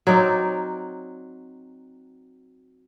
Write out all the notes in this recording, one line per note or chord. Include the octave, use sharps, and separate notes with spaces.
F#3 C4 D#4 D5